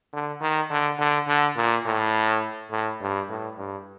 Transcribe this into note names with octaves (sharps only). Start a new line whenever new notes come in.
D3
D#3
D3
D3
D3
A#2
A2
A2
G2
A2
G2